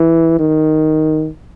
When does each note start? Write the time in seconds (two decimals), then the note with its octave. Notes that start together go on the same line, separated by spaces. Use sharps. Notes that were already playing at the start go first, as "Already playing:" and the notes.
Already playing: E3
0.39 D#3